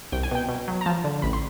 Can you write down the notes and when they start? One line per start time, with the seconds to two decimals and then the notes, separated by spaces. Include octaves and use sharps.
0.12 C2 G5
0.23 G#5
0.31 B2 G5
0.48 B2
0.68 F#3
0.81 A#5
0.86 F3 A5
1.04 D3
1.22 A1 B5
1.33 C6